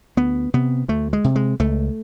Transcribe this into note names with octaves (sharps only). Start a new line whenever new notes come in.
D2 B3
C3 B3
D2 A3
G#3
C3
G#3
C#2 A3